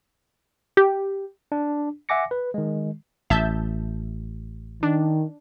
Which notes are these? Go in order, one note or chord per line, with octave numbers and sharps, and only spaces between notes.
G4
D4
E5 F#5 G#5 D6 A#6 C#7
B4
D#3 G#3
A1 E5 A5 G6
D#3 D4